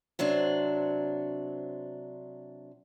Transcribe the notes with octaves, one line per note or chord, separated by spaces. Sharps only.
C3 F#3 C4 D4